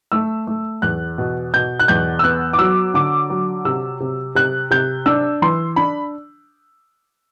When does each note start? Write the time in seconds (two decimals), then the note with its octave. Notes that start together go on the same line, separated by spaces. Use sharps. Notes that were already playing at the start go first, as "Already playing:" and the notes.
0.12 A3 E6
0.47 A3
0.82 E2 F#6
1.18 B2
1.54 B2 G6
1.80 F#6
1.88 E2 G6
2.19 E6
2.24 B3 F#6
2.53 D6
2.59 F#3 E6
2.94 D3 D6
3.30 F#3
3.65 C3 E6
4.00 C3
4.35 C3 F#6
4.71 C3 G6
5.06 D4 E6
5.42 E3 C6
5.76 D4 B5